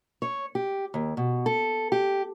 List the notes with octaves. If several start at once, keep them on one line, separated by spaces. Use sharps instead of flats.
C#5
G4
D#2
B2
A4
G4